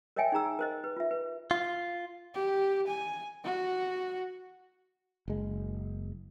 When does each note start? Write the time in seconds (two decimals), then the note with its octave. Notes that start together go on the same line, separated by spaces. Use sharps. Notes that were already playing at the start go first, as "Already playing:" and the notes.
0.16 A#4 C#5 D#5 E5 G5 G#5
0.32 D#4 G#4 A#5 E6
0.59 A#4 C5 D#5
0.84 B4
0.97 F4 E5
1.11 B4
1.51 F4
2.34 G4
2.87 G#5
3.44 F#4
5.28 F#1 G#3